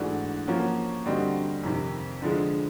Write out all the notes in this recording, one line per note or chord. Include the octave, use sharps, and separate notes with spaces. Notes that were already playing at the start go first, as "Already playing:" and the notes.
Already playing: G#2 E3 A3 D4 F#4
F3 A#3 C#4 F#4
D3 G3 C4 D#4 F#4
F2 C3 D#3
D3 F3 G#3